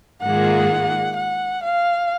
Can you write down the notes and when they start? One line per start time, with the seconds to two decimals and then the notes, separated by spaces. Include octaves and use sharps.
0.22 G#2 D#3 A#3 F4 G#4 F#5
1.16 F#5
1.63 F5